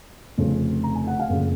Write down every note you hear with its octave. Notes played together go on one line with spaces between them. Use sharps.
F1 F2 C#3
A#5
G#5
F#5
F5 G#5
F#1 F2 C#3